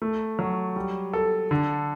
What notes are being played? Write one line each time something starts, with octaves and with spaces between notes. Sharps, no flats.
A3
F#3
G3
A4
D3